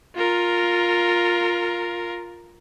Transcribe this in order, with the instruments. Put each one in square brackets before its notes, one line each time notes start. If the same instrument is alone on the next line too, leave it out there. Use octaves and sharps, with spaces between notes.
[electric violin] F4 A#4